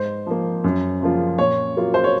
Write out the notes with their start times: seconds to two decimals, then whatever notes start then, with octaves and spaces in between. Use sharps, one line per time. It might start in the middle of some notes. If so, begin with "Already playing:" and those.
Already playing: G#2 C5
0.26 F3 A#3
0.64 F#2
1.01 C#3 F3 A#3 F4
1.38 A#2 C#5
1.77 F#3 A#3 F4
1.94 C5
2.04 C#5